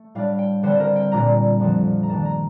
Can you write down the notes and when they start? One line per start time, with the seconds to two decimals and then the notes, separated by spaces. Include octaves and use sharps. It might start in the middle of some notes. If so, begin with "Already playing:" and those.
Already playing: A3
0.15 A2 G3 D4 F5
0.39 G5
0.63 D3 G3 C4 C5
0.80 A#4
0.96 G5
1.12 A#2 G3 A#3 D4 A#5
1.59 F2 D3 F3 A3 C4
2.03 A#5
2.09 G2 D#3 A#3 D4 A5
2.25 A#5